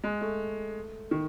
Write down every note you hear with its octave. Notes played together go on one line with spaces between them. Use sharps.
G#3
A3
D#3